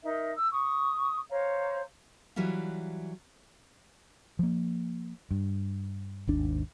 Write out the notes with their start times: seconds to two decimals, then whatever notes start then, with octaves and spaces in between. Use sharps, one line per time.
0.02 D#4 A#4 E5
0.35 E6
0.51 C#6 D#6
1.30 C5 C#5 F5 A#5
2.36 E3 F#3 G3 E4 F4
4.39 F3 A#3
5.31 G2
6.27 G#1 D#2 D4